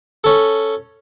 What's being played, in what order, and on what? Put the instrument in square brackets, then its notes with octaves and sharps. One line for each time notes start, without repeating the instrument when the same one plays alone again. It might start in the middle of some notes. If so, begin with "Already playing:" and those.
[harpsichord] C#4 A4